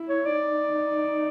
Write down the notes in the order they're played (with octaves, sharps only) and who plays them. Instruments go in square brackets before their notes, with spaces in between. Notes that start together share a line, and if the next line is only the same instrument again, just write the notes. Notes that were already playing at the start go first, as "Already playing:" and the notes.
Already playing: [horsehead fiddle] E4
[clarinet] C#5
[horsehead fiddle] D#4 [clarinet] D5